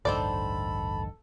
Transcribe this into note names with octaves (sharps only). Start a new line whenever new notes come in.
A1 D2 G2 D#3 A4 C5 D5 B5